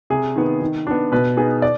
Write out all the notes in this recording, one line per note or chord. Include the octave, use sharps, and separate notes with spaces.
C3 G#4
D#3 B3
D#3
B3 D4
B2 B4
B3 D#4 G#4
D5